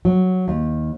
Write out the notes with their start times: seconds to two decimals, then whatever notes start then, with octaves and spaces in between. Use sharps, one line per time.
0.05 F#3
0.48 D#2